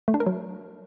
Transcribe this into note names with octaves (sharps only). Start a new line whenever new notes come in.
A3
D4
A#4
F#3